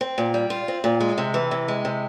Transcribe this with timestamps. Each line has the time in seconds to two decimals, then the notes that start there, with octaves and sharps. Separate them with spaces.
0.01 C4
0.18 A#2
0.34 G3
0.50 F4
0.68 C4
0.84 A#2
1.00 G#3
1.18 C3
1.34 E3
1.51 C3
1.68 G#3
1.85 C3